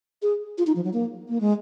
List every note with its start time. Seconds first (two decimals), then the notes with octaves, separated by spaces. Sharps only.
0.22 G#4
0.58 F4
0.67 D#4
0.76 F3
0.84 F#3
0.93 A#3
1.29 A#3
1.40 G#3